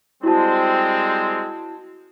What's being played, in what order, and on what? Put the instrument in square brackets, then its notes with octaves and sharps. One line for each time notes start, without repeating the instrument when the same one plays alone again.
[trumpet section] G3 G#3 C4 [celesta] E4 F#4 A5